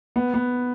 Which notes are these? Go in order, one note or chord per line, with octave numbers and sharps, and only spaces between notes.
B3
B3